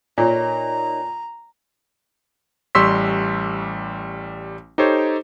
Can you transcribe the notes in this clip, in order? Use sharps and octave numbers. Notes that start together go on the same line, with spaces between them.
A#2 D#4 A#4 C#5 A#5
A1 G3 C6 C#6 E6 B6
D#4 G4 A4 C5 C#5